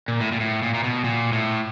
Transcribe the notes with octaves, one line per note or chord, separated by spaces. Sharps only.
A#2
A2
A#2
A2
A#2
A#2
B2
A#2
A2